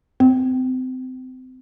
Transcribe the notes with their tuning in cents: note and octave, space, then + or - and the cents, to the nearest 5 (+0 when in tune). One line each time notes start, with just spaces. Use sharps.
C4 -30